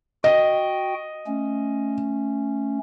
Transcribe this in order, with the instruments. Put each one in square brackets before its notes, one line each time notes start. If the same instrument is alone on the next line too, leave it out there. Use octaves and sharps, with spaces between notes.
[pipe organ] F#4 G5 [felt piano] D#5
[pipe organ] A3 C#4